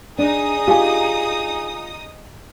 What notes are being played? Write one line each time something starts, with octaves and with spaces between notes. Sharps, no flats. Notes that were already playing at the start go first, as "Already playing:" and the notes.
D4 D#4 G#4 D#6
F4 G4 G#5